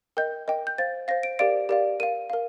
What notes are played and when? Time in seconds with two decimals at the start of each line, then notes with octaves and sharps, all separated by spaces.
0.17 A#4 D#5 G5 G6
0.48 A#4 D#5 G5
0.67 G6
0.78 C5 F5 A6
1.08 C5 F5 A#6
1.23 D7
1.39 G4 A#4 D5 F5 D7
1.69 G4 A#4 D5 F5
2.00 A#4 F5 D#7
2.30 A#4 F5